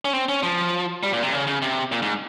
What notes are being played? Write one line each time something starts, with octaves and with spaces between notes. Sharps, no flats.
C#4
C4
C#4
F3
G3
A#2
C3
C#3
C#3
C3
A#2
G#2